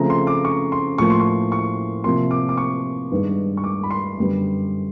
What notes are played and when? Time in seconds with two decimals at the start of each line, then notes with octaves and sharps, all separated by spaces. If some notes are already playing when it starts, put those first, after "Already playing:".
Already playing: C#3 F3 A3 C4 A#5
0.10 C6
0.27 D6
0.45 C#6
0.72 C6
0.98 A2 F3 A#3 C#6
1.10 C6
1.21 C#6
1.52 C#6
2.04 C3 F3 A#3 C6
2.31 D6
2.49 D6
2.57 C#6
3.12 G2 D#3 G#3 B3
3.57 C#6
3.64 D6
3.83 B5
3.90 C6
4.17 F#2 D3 G3 B3